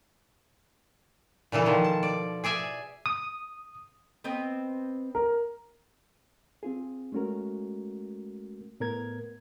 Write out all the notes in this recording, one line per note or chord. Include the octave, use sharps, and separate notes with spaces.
A#2 C#3 E3 A4
B2 D#3 F3
A5
D5
G#4 D5 E5 G#5
D#6
B3 C4 D#5
A#4
C4 F4 G#4
G#3 A3 C#4 F#4 A#4
A2 B3 A#4 G#6